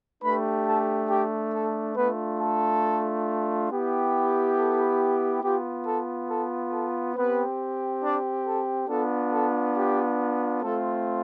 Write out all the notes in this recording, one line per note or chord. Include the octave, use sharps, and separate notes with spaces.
A3 D4 G4 B4 B5
A4 A5
G4 G5
A4
A3 B3 D4 F4 B4
A4
B3 E4 G4
A4
B3 F4 G4
A4
A4
A4
B3 C4 G4 B4
D4 D5
A4
B3 D4 F4 A4
A4
G4
A3 C4 F4 A4